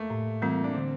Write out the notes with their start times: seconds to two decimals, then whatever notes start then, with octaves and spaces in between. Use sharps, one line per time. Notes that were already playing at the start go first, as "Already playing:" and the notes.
Already playing: A3 A#3
0.10 A2
0.42 E3 G3 A#3 C4 F4
0.64 D4
0.74 D3 C4